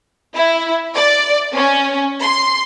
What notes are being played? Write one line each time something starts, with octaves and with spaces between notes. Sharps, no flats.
E4
D5
C#4
C6